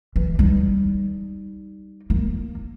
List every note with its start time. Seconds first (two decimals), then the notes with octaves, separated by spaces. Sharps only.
0.16 E3
0.39 G3 D#4
2.10 A#3